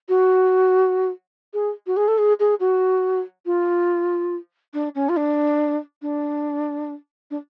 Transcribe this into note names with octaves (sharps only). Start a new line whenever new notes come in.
F#4
G#4
F#4
G#4
A4
G#4
G#4
F#4
F4
D4
C#4
F4
D4
D4
D4